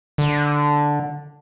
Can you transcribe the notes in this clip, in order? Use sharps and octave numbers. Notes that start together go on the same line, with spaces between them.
D3